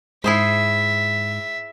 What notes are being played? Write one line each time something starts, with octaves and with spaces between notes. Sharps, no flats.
G#2 E4 G#4 C5 E5